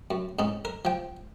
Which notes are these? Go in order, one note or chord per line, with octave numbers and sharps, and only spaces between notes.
F#2
G#2 C#4 D#4
A#4
F3 G5